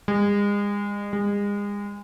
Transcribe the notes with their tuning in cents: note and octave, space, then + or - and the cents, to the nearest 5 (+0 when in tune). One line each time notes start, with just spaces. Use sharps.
G#3 -35
G#3 -35